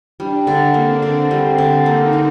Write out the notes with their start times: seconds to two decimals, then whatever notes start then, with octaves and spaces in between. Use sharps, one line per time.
0.20 G3 D4
0.47 D3
0.74 A#3 C4
1.02 D3
1.31 G3
1.58 D3
1.86 A#3 D#4
2.13 D3